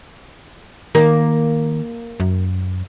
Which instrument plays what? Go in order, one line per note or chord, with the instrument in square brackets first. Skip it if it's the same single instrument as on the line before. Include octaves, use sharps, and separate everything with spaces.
[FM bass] D#3 [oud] A#3
[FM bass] F#2